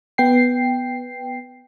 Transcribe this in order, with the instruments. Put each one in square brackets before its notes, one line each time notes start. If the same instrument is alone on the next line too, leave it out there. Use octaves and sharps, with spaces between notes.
[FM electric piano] B3 G5 C7